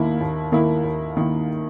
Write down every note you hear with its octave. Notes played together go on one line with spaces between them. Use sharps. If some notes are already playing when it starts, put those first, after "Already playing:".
Already playing: D#2 D#3 A#3 E4
D#2
D#3 A#3 E4
D#2
D#3 A#3 E4